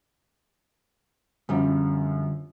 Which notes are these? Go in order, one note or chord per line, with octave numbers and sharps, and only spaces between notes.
F#2 D3 F3 G3